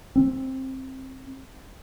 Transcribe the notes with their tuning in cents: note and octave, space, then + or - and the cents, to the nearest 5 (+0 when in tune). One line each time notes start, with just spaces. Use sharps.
C4 +15